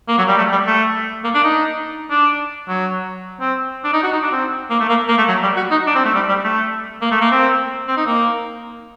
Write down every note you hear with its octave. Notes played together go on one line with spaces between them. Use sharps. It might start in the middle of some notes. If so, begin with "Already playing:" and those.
A#3
F#3
G3
A3
G3
A3
A#3
D4
D#4
D4
F#3
C4
D4
D#4
F#4
D#4
D4
C4
A#3
A3
A#3
A#3
A3
F#3
G3
F#4
D#4
D4
C4
A3
G3
G3
A3
A#3
A3
A#3
C4
C4
D#4
A#3